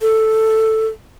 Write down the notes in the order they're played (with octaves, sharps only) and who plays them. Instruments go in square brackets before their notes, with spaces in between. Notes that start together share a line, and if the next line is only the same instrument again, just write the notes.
[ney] A4